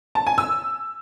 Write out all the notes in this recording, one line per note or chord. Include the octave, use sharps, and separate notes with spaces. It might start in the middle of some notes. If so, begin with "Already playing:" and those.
A5
G#5
E6